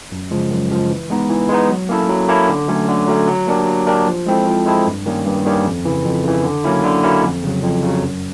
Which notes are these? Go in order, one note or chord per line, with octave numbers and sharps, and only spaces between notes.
F#2
C#3 F3 G#3
F#2
C#3 F3 G#3
E3
G#3 B3 D#4
E3
G#3 B3 D#4
F#3
A#3 C#4 E4 A4
F#3
A#3 C#4 E4 A4
D3
F#3 A3 C#4
D3
F#3 A3 C#4
F#3
A#3 D4 G4 A#4
F#3
A#3 D4 G4 A#4
F3
G#3 C4 E4 A4
F3
G#3 C4 E4 A4
G2
D#3 G3 A#3 C#4
G2
D#3 G3 A#3 C#4
F2
C#3 E3
F2
C#3 E3
D3
F#3 A#3 C#4 E4
D3
F#3 A#3 C#4 E4
F2
C#3 F#3
F2
C#3 F#3
F#2